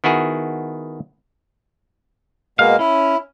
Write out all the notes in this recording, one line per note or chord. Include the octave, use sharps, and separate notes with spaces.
D#3 B3 E4 F#4 G#4
B2 G#3 A#3 F5
C#4 E4